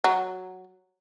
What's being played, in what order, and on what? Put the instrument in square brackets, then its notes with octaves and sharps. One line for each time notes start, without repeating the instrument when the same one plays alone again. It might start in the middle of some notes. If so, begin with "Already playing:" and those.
[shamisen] F#3